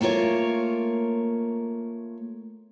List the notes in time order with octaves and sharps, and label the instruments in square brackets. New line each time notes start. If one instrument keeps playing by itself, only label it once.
[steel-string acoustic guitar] A3 A#3 F4 A#4 C#5